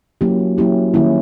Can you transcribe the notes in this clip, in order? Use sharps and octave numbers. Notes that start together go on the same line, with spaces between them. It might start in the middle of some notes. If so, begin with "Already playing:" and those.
F#3 A#3 C#4 E4 G4
F#3 A#3 C#4 E4 G4
D#3 G3 A#3 C#4 E4